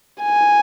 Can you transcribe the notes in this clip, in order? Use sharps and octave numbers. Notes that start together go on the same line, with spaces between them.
G#5